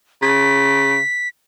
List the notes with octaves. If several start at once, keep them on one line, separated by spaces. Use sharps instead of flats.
C#3 B6